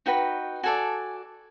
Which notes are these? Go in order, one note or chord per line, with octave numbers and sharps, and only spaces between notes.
D#4 F#4 B4 G5
F#4 A4 D5 G#5